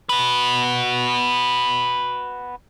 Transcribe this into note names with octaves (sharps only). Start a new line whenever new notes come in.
F#4 B4